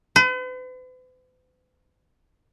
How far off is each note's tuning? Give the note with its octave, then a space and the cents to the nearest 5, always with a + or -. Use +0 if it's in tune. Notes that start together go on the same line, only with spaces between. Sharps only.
B4 +45